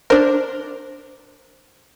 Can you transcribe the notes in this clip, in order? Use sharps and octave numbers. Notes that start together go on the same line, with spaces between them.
D4 A#4 C5